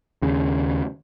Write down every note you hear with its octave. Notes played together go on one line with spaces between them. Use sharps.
D#2 C#3